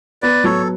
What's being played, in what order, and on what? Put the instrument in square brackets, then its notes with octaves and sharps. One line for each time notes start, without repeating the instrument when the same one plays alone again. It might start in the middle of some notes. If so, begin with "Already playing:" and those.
[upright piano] B3 [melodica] B4 D5
[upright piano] F#3 [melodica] A4 C#5